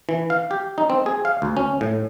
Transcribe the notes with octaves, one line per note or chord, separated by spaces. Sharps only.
E3
F5
G4
D#4
C4
G#4
F5
D2
C#4
A2